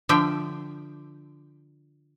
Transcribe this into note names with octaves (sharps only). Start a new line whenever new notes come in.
D3 F3 E5 G5